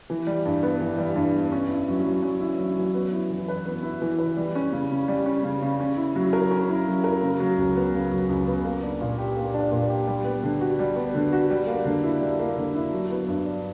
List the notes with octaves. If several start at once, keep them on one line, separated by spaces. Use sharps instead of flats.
E3
G3
G2
B3
E3
G3
G2
B3
C#4
E4
F#3
F#3
C#4
E4
F#3
F#3
B3
E4
E3
B4
B3
E4
E3
B4
G3
C#4
C#3
C#3
G3
C#4
C#3
C#3
C#4
E4
F#3
A#4
C#4
E4
F#3
A#4
C#3
F#3
C#2
B3
C#3
F#3
C#2
B3
A#3
D4
A#2
G4
A#3
D4
A#2
G4
G3
B3
D3
F#4
G3
B3
D3
F#4
G3
A#3
D3
E4
G3
A#3
D3
E4
F#3
B3
G2
D4